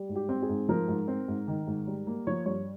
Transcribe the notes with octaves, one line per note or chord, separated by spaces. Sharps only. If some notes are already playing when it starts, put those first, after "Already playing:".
Already playing: G3
G#2
G4
C4
G#4
G#2
F3 A#4
G#2
C4
G#2
D#3
G#2
G3
A#3
F3 C#5
G2 C#5